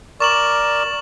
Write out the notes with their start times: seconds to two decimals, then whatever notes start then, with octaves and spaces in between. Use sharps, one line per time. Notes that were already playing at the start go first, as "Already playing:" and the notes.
0.20 A#4 D5 C#6 E7 F#7